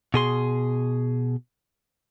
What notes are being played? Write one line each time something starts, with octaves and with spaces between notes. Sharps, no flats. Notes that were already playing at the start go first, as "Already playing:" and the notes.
B2 G#4 C6